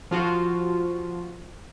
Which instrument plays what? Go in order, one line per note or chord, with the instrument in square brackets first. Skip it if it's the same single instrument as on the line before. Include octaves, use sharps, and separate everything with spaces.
[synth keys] F3 F4 F#4